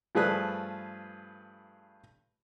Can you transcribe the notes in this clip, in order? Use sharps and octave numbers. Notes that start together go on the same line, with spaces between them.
G2 F3 A3 G#4 B4 F#6